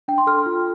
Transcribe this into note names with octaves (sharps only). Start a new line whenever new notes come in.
D4 G5
C6
A4 F6
F4